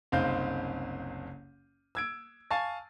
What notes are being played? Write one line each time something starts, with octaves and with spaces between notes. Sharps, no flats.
F#1 C2 C4 D#4 F5 G6
E6 G#6 D7
F5 G#5 A5 C#6 A6